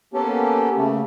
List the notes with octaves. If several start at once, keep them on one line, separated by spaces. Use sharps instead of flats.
A#3 B3 C#4 G4 A4
C#3 A3